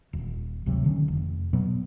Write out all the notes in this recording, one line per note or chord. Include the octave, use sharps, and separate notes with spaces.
D#1
G#1 D2 C3 F#3
D3 D#3 G3 C#4
F1
B2 F#3 B3